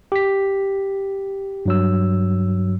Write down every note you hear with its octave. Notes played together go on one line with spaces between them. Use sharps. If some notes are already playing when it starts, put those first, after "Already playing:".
G4 B6
G2 F#3 E6